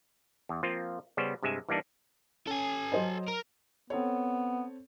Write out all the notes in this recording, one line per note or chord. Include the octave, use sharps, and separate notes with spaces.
E2
F3 A#3 C4 F4
C#3 G3 B3 C#4 C5
G2 C3 G#3 E5 G#5
E3 G3 A#3 D4 D#4
C#4 A4 G#5
F#3 C5 D#5
A#4
B3 C4 A4 C#5